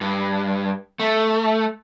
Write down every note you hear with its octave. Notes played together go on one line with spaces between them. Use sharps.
G2
A3